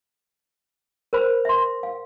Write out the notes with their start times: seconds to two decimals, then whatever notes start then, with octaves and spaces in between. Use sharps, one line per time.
1.13 A#4 C5 B5
1.45 E5 C6
1.83 F5